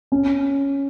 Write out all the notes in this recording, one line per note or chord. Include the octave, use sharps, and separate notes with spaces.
C#4